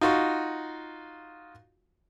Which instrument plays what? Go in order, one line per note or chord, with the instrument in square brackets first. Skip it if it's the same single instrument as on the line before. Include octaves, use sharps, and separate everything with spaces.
[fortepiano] D#4 F4 F#4